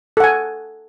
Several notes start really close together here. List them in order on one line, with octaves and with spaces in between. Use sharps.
A4 F#5 G#5